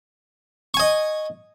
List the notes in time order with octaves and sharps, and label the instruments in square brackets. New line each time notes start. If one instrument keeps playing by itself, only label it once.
[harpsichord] C#6
G#5
D#5